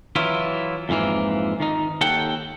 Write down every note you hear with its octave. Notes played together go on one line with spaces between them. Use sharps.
E3 F#3 E4 F4
F2 G#2 E3 A#3
D#3 D#4
D#2 A4 F#5 G5